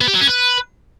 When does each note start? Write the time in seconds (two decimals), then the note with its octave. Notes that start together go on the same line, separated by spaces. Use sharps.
0.01 B3
0.08 G4
0.14 F#3
0.21 C#4
0.27 B4